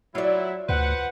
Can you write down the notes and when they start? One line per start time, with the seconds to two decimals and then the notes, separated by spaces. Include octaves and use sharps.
0.15 F#3 E4 F4 D5
0.69 D2 B4 C5 F#5